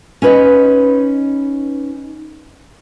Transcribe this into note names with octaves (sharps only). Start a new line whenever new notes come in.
C#4 D#4 B4 C#5 D#5